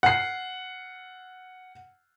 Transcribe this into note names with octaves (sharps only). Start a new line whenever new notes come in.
F#5 C7